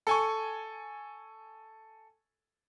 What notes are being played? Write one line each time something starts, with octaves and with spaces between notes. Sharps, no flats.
A4 G#5 C#6